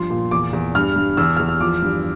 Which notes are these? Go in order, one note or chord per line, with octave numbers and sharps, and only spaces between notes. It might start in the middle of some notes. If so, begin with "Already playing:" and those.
Already playing: G2 F3 C6
A#2
E2 D6
E2
G2 F6
G2
E2 E6
E2 F6
E6
F3 D6
G2